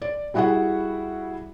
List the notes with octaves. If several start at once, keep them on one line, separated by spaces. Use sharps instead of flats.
D5
G3 E4 F#4 G#4 E5 F#5